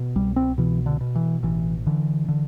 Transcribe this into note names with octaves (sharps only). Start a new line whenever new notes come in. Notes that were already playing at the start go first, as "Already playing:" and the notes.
Already playing: B2
C2 G3
C4
B2 E3
D3
B2
E3
A1 E3
D3 E3
D3